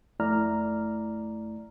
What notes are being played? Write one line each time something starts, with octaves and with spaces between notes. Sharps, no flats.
F2 A3 E4 D5 A#5 F6